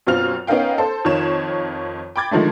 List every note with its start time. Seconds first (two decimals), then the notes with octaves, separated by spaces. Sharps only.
0.07 F#2 B2 C4 F4 F6 F7
0.47 B3 C#4 D#4 A#4 F5 G5
0.78 A4 C5
1.04 F2 D#3 F4 C#5 E7
2.16 G5 B5 D6 G#6 A6
2.31 D3 D#3 F3 G#3 A3